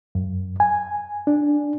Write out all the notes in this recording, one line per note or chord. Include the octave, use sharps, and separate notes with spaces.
F#2
G#5
D4